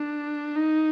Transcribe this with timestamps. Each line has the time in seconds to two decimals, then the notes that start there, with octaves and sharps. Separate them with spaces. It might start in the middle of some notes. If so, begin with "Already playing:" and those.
Already playing: D4
0.56 D#4